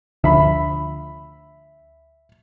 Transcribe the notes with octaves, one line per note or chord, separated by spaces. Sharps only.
D2 D3 F3 E5 B5